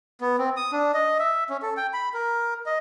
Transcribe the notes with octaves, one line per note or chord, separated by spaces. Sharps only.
B3
C4
D#6
D4
D#5
E5
C#4
A4
G5
B5
A#4
D#5